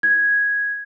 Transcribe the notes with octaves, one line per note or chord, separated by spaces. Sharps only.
G#6